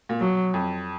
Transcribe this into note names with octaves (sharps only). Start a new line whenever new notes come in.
A#2
B2 F#3
F2